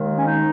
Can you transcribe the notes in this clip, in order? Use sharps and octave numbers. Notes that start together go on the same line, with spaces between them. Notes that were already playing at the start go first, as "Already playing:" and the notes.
Already playing: D#2 D#3 G#3
C#4
D#4